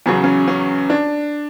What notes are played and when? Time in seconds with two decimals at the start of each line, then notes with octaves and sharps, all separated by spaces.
0.06 E2 C#3 F#3 C#4
0.24 C#4
0.48 C#4
0.90 D4